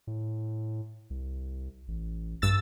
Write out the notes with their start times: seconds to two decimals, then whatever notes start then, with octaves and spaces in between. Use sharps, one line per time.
0.07 A2
1.10 C2
1.88 A1
2.42 A#1 G2 E6 A6